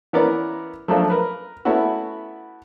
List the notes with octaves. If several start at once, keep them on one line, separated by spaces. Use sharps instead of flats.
E3 A#3 B3 C#4 A#4 D5
F3 F#3 A3 A#3 D4 F4
A#4 B4
A3 B3 C#4 E4 F#4